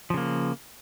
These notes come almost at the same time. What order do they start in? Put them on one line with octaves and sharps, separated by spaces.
F3 C#3 A#3